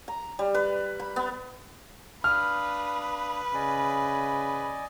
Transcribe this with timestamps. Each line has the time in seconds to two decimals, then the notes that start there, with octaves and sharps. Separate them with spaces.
0.08 A#5
0.39 G3
0.54 B4
1.00 B5
1.16 B3
2.24 D4 B4 F5 D#6 F6
3.54 C#3 D5 D#5 G#5